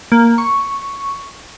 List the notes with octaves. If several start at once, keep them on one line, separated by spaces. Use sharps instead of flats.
A#3
C#6